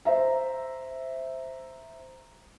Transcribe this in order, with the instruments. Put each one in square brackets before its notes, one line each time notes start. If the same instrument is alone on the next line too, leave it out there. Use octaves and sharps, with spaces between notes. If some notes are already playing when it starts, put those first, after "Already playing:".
[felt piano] C5 E5 A#5